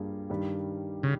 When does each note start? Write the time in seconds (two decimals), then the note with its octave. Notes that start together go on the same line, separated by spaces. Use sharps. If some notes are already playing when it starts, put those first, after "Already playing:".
Already playing: G2 G3 A#3 F4 G#4
0.29 G2 D#3 G3
1.03 C#3